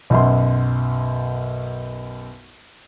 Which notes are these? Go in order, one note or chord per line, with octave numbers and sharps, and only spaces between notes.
B1 F#2 C6